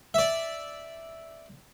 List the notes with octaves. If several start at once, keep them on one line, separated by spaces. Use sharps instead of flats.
D5 E5